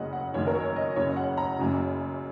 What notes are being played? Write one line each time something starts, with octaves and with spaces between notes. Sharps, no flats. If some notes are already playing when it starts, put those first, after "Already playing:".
Already playing: F#1 F#2 C#3 D#5 F#5
F#5
F#1 F#2 D#3 C#5
A#4
C#5
D#5
F#1 F#2 C#3 C#5
F#5
A#5
F#1 F#2 C#3